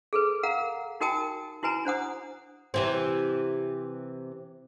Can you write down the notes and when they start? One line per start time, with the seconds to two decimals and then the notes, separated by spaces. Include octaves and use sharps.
0.13 G#4 A4 B4
0.43 A#4 F5 F#5 A#5
1.01 D#4 F#4 A#4 G5 A5 D#6
1.63 E4 F#4 B4 G#5 A#5
1.85 D4 C5 F#5 D#6
2.74 C3 E3 C4